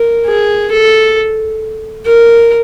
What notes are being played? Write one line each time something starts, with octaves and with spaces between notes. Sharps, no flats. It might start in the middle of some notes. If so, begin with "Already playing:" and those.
Already playing: A#4
G#4
A4
A#4